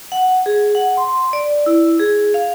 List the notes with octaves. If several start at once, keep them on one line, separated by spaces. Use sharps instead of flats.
F#5
G#4
F#5
C6
D5
E4
G#4
F5